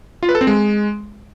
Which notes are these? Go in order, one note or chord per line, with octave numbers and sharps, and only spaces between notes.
F4
B4
A4
C4
G#3